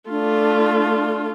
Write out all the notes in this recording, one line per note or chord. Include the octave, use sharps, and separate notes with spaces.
A3 D4 F4